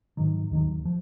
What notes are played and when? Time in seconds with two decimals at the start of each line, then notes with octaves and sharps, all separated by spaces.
0.17 G#2 D#3 F#3
0.51 D#2 D#3 F#3
0.85 F3